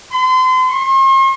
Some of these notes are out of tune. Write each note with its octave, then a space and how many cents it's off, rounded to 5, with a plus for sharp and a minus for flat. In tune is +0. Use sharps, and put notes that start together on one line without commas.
C6 -35
C6 +45